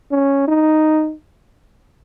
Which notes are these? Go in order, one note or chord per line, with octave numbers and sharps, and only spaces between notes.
C#4
D#4